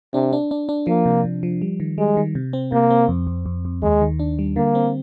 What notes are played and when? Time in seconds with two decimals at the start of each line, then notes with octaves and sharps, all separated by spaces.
0.13 C3 D4
0.33 D4
0.51 D4
0.69 D4
0.87 F3 A#3
1.06 C3
1.25 C3
1.43 F3
1.62 G3
1.80 D#3
1.98 G3 G#3
2.17 D#3
2.35 C3
2.53 C4
2.72 C3 A#3
2.90 C4
3.08 F2
3.27 F2
3.46 F2
3.65 F2
3.83 D#2 G#3
4.01 D#3
4.19 D4
4.39 G3
4.56 D3 A#3
4.75 C4